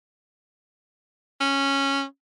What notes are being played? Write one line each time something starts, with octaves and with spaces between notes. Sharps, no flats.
C#4